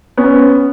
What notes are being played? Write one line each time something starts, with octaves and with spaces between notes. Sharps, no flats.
B3 C#4